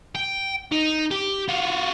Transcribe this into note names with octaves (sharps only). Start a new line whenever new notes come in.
G5
D#4
G4
F4 F#4